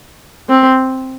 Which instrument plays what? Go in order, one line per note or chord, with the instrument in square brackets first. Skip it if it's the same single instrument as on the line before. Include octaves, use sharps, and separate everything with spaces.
[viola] C4